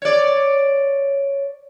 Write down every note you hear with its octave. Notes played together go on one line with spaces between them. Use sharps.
C#5 D5